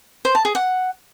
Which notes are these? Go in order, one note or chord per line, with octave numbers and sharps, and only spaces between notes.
C5
A5
G#4
F#5